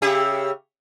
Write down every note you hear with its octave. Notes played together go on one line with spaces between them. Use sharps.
C#3 G4 E5